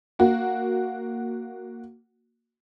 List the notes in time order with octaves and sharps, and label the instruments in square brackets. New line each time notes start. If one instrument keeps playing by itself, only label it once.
[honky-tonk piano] A#3 F#4